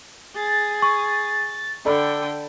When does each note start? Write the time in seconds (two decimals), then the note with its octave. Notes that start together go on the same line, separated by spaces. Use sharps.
0.35 G#4 A6
0.82 C#6
1.85 D3 A4 D5 G5 B5